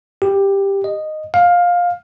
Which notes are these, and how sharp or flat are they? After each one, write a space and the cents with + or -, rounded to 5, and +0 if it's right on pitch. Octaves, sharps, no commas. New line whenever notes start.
G4 +10
D#5 -10
F5 +15